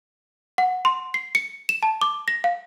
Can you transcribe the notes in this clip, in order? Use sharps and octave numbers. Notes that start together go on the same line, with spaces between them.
F#5
C6
C7
C#7
E7
A5
D6
A#6
F5